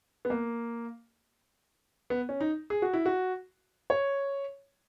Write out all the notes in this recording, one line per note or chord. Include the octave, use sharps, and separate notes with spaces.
B3
A#3
B3
C#4
D#4
G#4
F#4
E4
F#4
C#5